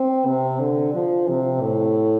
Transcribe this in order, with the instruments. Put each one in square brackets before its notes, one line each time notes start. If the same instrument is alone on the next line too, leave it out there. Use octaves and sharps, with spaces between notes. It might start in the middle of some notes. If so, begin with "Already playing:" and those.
Already playing: [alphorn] C4
C3
D3
F3
C3
A2